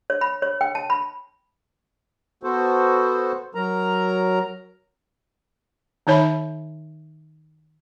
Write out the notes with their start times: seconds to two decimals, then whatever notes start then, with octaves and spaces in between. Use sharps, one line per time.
0.10 C#5
0.21 B5
0.42 C#5
0.61 G5
0.75 A5
0.90 B5
2.43 B3 F#4 A4 C5
3.55 F#3 A#4 A#5
6.07 D#3 D#4 C#5 E5 B5